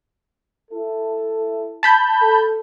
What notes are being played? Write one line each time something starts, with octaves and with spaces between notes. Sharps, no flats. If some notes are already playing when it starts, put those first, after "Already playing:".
E4 A4
A5 B5 G6
A4